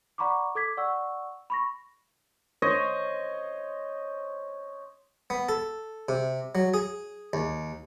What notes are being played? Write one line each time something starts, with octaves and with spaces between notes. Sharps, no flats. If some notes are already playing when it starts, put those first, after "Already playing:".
D5 F#5 A#5 B5 C#6 D6
A4 D6 G#6 B6
D5 F#5 C#6 E6
B5 C#6 A#6
C5 C#5 D#5 C6
B3
A4
C3
F#3
G#4
D#2